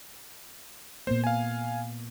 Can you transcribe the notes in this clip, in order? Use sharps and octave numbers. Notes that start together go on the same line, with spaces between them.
A#2 A#3 B3 C5
F5 G#5